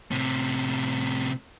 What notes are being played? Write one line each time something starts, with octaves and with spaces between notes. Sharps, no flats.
A2 C3